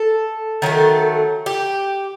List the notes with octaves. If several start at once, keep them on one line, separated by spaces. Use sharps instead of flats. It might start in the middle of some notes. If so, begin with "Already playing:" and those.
Already playing: A4
D#3 F#3 A3
G4